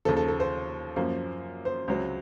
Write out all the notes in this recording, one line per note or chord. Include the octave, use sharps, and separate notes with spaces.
D#2 C#3 F3 A4
A4
A4
C5
F#2 F3 A#3
C5
C#2 C3 F#3 C4